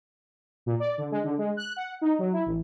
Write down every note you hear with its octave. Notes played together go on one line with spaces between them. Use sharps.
A#2
D5
D3
G#3
D3
G#3
F#6
F#5
D#4
F#3
E4
A1